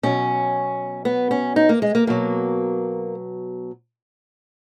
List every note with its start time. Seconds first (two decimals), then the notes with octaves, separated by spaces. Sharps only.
0.03 B2 F#3 C#4
1.05 B3
1.31 C#4
1.56 D#4
1.69 A#3
1.82 G#3
1.95 A#3
2.07 B2 F#3 A#3